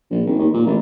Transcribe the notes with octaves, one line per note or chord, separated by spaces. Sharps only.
A#1
G#1
D#2
A#2
A1